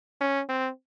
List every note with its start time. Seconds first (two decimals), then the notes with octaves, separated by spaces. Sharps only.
0.21 C#4
0.49 C4